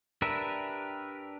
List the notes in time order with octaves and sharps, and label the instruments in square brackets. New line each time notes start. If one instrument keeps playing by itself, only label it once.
[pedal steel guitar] D4 G4 A#4 B4 E5